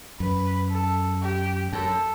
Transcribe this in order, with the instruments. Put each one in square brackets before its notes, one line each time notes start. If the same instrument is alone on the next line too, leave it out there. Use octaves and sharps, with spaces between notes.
[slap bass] F#2 [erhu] B4
[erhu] A4
G4
[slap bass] F#2 [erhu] A4